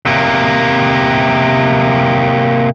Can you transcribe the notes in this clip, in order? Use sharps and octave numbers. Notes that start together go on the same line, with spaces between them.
C3 A#3